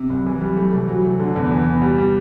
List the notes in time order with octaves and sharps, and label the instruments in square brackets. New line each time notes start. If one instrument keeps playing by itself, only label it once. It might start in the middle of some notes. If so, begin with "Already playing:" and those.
Already playing: [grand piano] C3
[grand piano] C2 [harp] F#3
[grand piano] E3
G3
[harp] F#3 [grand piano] A3
[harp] C3 [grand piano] E3
[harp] C3 [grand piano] F#3
[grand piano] A3
D3
E2
E3
B3
G3
G3